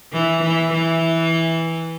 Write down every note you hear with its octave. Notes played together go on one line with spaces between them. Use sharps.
E3
E3
E3